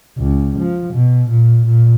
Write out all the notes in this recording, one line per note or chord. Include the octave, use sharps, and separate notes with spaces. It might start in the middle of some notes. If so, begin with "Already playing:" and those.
C#2
F3
B2
A#2
A#2